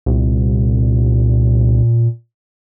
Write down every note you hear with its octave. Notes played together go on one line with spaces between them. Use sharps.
C2 A#2